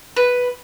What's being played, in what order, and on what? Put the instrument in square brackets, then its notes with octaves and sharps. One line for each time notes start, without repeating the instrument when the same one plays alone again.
[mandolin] B4